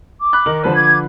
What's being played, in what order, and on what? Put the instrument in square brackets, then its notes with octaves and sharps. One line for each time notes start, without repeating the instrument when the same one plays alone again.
[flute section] D6
[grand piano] B5 F#6
D#3 A#4 F#7
[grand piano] D3 F3 B4 [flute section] C5 D5 A5
[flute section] D6 G#6